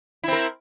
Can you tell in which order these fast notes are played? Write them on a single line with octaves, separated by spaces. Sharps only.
E4 C4 A#4